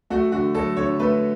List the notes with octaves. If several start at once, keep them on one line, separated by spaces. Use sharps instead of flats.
A3 F#4
D3 F#4
F#3 A4
D3 C#5
A3 B4